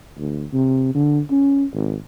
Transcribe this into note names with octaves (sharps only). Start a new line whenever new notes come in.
D2
C3
D3
C#4
G#1